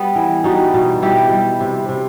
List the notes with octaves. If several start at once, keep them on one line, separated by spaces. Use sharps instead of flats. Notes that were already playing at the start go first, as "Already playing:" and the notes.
Already playing: G3 B3
E3
G3 D#4 F#4
B2
G3 E4 G4
G3
C3
C3